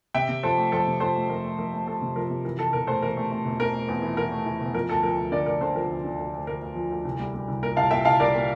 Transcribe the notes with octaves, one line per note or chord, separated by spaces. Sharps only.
C3 E5 G5
C3
F3 A4 C5
A3
F2 A4 C5
C3
F3 A4 C5
A3
F2 A#4
A3
F2 A#4
A3
A3 A4
C3
F3 A#4
C3
E3 A#4
E3 A4
E1 A#4
A3 A4 C5
E3 A#4
A3
A3
E1
A3 A#4
A3
E2
E3
E3 A#4
A3
E3
E1
F3 A#4
D2 A4
F3 A#4
D2
D3 A#4 D5
D2 A#4 D5
D3 A4 C5
F3 A#4
D2
D3
D2
D2
D2 A#4
D2
F3
D2
C2
G3
G3
C2
A#2 A#4
C2 F5 A5
A#2 E5 G5
C2 F5 A5
C2 A#4 D5
A#2